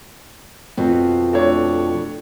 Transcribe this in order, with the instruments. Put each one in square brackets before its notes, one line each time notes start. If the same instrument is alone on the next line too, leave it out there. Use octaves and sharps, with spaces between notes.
[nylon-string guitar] F2 B2
[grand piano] A3 D4 C#5